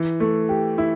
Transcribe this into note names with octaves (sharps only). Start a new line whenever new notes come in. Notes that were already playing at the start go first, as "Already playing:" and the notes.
Already playing: E3
A3
G4
E4